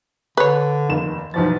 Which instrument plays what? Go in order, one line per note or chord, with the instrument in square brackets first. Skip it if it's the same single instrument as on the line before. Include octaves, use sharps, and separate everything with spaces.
[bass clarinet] D3 [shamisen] B4 C#5
[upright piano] F1 D#2 E7
[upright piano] B1 E2 A6 [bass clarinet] F3